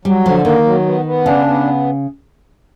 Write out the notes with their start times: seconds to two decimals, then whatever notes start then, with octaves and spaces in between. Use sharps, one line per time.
0.05 F#3 G3
0.25 D3 F3
0.45 D#3 A#3
0.65 F#3
0.86 B3
1.05 B3
1.26 C#3 D4
1.47 B3